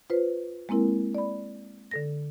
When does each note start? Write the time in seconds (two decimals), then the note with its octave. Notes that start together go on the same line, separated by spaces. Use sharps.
0.10 F4 B4 C5
0.69 G#3 A#3 C4 E4 A#4
1.15 D5 B5
1.91 D3 A4 A#6